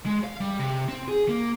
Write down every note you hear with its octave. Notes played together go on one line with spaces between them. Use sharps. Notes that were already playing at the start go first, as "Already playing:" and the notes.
G#3
F5
G3
C3
C4
G#4
A#3